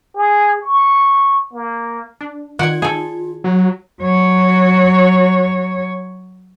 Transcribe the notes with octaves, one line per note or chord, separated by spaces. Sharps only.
G#4
C#6
A#3
D4
D#3 D#4 F4 D5 F#5 G#6
G#4 A4
F#3
F#3 C#5